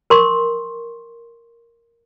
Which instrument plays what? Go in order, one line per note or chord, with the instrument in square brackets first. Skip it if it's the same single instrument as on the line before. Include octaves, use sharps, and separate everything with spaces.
[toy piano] A#4 C6 C#6